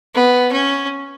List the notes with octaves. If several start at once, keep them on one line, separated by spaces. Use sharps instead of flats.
B3
C#4